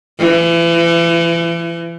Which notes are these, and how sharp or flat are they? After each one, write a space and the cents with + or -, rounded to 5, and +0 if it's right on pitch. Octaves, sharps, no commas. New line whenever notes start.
E3 +35